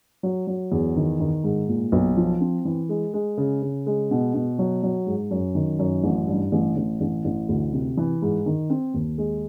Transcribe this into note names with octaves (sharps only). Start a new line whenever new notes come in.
F#3
F#3
E2
D#3
D#3
G#2
A#2
B1
F3
C4
E3
G#3
G#3
C#3
C#3
G#3
B2
B2
F#3
F#3
G#2
F#2
D#3
F#2
A1
G2
A1
A1
A1
A1
D2
C3
E3
G#2
D#3
C4
D#2
G#3